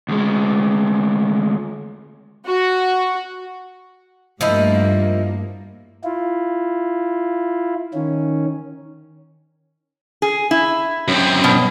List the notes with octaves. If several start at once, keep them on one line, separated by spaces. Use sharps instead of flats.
D2 G#3
F#4
G2 F3 A3 A#3 D#4 E4
E4 F4
D#3 C#4
G#4
E4
F#2 C4
B2